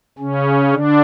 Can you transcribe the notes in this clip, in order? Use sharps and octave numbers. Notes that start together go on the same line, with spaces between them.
C#3 C#4
D3 D4